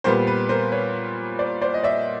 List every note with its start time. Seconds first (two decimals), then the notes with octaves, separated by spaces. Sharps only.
0.04 A#2 G3 B3 A#4 C5
0.27 B4
0.49 A#4 C5
0.72 B4 C#5
1.39 C5 D5
1.61 C5 D5
1.74 D#5
1.83 D5 E5